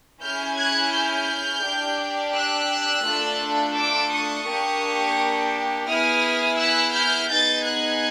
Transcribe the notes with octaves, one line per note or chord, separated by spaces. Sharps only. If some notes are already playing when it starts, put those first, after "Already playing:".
C#4 E4 G#4 F6 G6
F#6 G#6
F6 G6
D4 G4
E6 F#6
A3 D4 F4 A4
D6 E6
C#6 D#6
A#3 D4 G4
B3 E4 G#4 D#6 F6
E6 F#6
F6 G6
B3 D#4 G#4 G6 A6
F#6 G#6